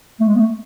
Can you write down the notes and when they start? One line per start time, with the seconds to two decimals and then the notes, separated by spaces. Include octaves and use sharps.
0.20 A3
0.27 G#3
0.36 B3
0.40 A3